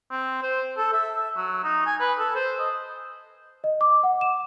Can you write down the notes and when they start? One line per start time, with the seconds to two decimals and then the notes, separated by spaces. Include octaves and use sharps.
0.11 C4
0.43 C5
0.77 A4
0.93 E5
1.16 E5
1.37 F#3
1.64 D#4
1.87 G#5
2.00 B4
2.19 A4
2.36 C5
2.60 D#5
3.64 D#5
3.81 D6
4.03 F#5
4.21 E7